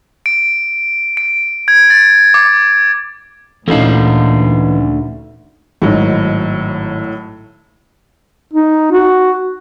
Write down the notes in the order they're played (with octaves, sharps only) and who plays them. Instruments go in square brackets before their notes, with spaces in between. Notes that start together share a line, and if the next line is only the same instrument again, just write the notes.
[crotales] D7
D7
G#6
A6
D6
[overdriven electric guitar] D2 [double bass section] A#2 [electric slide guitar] E3 F5 [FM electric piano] A3 C#4 D#4
[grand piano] G#1 D#4 [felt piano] A2 F#3
[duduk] D#4
F#4